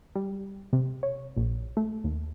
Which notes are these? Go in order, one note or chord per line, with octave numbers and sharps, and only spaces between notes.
G3
C3
C#5
A#1
A3
D#2